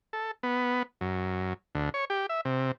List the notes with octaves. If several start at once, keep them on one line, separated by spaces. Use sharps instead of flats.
A4
B3
F#2
D2
C#5
G4
E5
C3